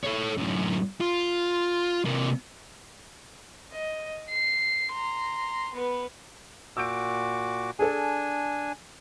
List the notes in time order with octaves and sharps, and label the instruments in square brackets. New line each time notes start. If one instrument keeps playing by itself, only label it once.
[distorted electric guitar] A4 C#5
F#2 A2
F4
C3 A#3
[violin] D#5
C7
A#5 C6
B3 B4
[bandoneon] A#2 F#4 D6 [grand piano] E6 G6 D7
[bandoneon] D4 G#5 [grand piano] G#4 A4